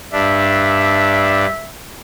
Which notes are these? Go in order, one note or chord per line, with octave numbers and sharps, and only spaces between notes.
G2 D4 E5